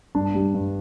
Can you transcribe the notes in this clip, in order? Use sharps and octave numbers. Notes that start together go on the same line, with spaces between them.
G2 D4
G3
G2